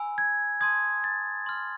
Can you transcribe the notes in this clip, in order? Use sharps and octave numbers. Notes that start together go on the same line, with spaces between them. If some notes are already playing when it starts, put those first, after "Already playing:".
Already playing: G#5 B5 E6
G#6
A5 C6 D#6 G#6
A6
C6 F6